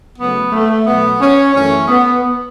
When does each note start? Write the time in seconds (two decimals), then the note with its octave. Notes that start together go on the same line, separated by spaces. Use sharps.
0.19 C#3 F#3 A3 B3
0.52 A3
0.86 B2 F#3 A3 B3
1.20 C#4
1.54 F#2 E3 A3 C#4
1.88 B3